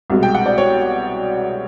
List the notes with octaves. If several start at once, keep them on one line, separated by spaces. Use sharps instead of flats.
C2 B2 G#3
G5
F#5
D5
C#5